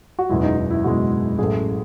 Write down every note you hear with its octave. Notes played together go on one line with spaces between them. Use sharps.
F#4
F#1 E2 B2 G#3 E4
D#4
D#4
E4
F#1 E2 B2 G#3 F#4
A1 A2 F#3 A3 G#4